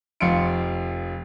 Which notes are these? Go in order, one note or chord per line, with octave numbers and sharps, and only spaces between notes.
F1 F3 F5 C6 C#7 D7